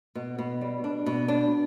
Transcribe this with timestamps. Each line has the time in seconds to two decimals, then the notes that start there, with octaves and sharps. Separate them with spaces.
0.15 B2
0.38 B2
0.61 G3
0.84 D4
1.06 B2
1.28 D4